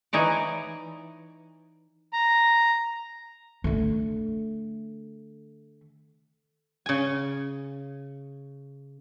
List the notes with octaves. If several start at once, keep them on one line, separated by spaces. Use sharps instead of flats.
E3 D#4 C#5 D5
A#5
D3 A3
C#3 G#5